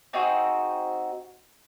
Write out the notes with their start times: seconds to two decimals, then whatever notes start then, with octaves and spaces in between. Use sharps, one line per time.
0.13 C4 D#4 F#4 G#4